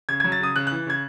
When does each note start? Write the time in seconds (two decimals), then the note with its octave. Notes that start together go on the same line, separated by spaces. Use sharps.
0.09 C#3 G#6
0.20 F#3 G#6
0.32 A6
0.40 C#3 D#6
0.56 C#3 F#6
0.67 E3 F#6
0.87 C#3 G#6